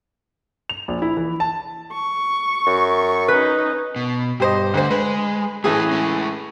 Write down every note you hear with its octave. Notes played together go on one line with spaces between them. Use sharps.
F7
A#1
E4
E3
A5
C#6
F#2
C#4 D#4 B4
B2
G2 G4 C5 D#5
D2 D3 C5
G#3 B4
A2 E3 A3 C#4 G#4
G#3 C#4